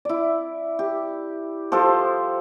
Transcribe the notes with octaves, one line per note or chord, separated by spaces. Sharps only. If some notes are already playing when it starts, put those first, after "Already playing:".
E4 D5
G4
F3 G4 A4 C5